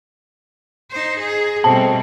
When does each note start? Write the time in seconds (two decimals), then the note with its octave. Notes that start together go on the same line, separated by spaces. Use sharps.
0.91 D#4 C5
1.20 G#4
1.64 B2 G3 A3 C4 A5